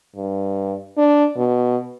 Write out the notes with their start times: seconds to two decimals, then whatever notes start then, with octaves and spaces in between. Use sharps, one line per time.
0.16 G2
0.97 D4
1.36 B2